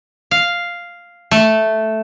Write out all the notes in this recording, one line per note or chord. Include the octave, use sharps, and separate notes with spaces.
F5
A3